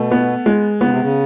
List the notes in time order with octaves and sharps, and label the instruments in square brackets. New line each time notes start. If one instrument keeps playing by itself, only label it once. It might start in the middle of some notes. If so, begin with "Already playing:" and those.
Already playing: [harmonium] B2 [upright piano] A3
[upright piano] B3
G#3
[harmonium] C#3 [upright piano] B3
[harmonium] C3
C#3